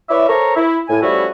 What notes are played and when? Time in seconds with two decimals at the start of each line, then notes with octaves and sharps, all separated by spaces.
0.09 E4 B4 C#5 D5 E5
0.28 A4 A#4 C5 C#5 A#5
0.55 E4
0.89 A2 G#5
1.01 F3 G3 A3 C#4 E4 F#4